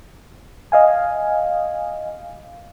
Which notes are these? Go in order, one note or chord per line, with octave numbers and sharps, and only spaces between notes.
D#5 F5 G#5